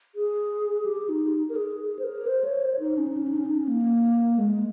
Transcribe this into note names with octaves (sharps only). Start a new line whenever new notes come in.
G#4
G4
D#4
A#4
G#4
G#4
C5
A#4
C5
C#5
C5
D#4
C#4
D#4
C#4
D#4
C#4
D#4
C#4
A#3
G#3